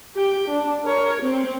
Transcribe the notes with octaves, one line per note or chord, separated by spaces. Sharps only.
G4 G5
D4
A#4 C#5
C4